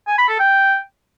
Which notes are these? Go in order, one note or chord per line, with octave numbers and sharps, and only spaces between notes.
G#5
B5
A4
G5